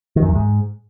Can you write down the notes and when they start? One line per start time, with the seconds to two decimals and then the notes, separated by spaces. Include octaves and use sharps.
0.16 D#3
0.23 F#2
0.29 E2
0.35 G#2